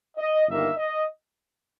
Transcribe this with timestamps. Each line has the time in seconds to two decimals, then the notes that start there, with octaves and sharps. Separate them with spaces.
0.17 D#5
0.46 G1 G2 D#3 A#3 E5
0.77 D#5